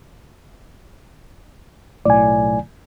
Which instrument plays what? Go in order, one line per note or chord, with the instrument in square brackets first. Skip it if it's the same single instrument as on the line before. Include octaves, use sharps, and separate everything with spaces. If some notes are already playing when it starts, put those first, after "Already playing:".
[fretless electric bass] B1 A2 [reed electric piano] D5 G#5